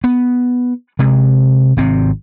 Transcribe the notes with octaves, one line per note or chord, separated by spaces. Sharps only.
B3
C3 G#3
G#1 C3 C4